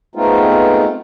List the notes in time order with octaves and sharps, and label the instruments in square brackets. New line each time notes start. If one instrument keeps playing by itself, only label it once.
[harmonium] G#3 A3 B3 C4 D#4 F4